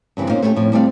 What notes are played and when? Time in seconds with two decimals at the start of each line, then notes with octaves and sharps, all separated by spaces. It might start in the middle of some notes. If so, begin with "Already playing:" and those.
0.17 G2 C#3 E3 G3 C4
0.29 A#3 C#4 D#4 F4 A#4 C5
0.42 A3 C#4 E4 F#4 G4 A4
0.56 F2 A2 F3
0.73 G3 A3 C4 G4 D5 F5